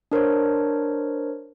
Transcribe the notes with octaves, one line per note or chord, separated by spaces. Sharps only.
D4 A#4 C5 C#5